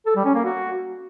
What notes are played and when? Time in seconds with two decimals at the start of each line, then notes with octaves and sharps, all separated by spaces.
0.06 A4
0.16 G3
0.25 C#4
0.35 A#3
0.44 F#4